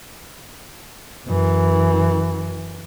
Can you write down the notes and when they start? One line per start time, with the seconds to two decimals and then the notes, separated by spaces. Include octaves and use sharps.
1.28 F#2 E3